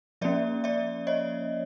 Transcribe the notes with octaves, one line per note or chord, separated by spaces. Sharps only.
F3 A#3 C#4 D5 E5
D5 E5
C#5 D#5